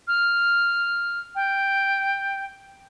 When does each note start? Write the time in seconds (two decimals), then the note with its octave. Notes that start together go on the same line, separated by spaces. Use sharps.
0.07 F6
1.35 G5